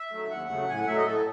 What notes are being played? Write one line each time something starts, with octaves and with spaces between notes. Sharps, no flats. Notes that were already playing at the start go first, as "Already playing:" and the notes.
Already playing: E5
D#3 F#3 A3
D#2 F#5
C#3 F#3 A3
A2 G#5
F#5
F#3 A3 E5
D#5
A2 A4